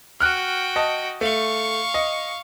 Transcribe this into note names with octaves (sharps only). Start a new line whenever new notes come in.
F#4 G5 F6 F#6
D#5 A5
A3 F5 C#6
D#5